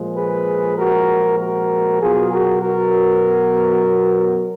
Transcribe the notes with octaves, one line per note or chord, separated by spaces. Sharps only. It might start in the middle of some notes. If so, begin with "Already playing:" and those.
Already playing: A#2 F3 G#3
G#4 B4
F#4 A#4
F#4 A#4
B2 F#3 B3 F4 G#4
F#4 A#4
F#4 A#4